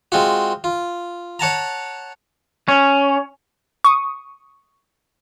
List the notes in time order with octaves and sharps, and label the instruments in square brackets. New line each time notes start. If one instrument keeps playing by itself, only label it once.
[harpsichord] G#3 C4 F4 F#4
F4
C#5 F#5 A5 A#5
[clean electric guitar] C#4
[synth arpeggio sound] C#6 D#6